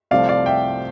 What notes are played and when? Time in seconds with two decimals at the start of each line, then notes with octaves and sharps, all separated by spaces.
0.11 C2 C3 F3 A3 D5 F5
0.29 D5 F5
0.46 E5 G5